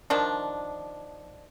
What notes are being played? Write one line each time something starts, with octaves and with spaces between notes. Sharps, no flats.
D#3 F3 D4